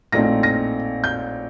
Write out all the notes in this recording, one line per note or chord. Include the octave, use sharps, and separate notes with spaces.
A#1 A2 A3 C4 D#4 A#6
A#6
G6